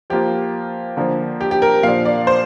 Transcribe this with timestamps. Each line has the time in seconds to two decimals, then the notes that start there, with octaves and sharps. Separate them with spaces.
0.10 F3 A#3 F4 G4
0.97 D3 F3 A#3
1.41 G4
1.51 G4
1.62 A#4
1.83 A#2 F3 D4 F5
2.05 D5
2.27 C5